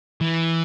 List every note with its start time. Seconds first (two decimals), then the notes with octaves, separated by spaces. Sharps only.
0.21 E3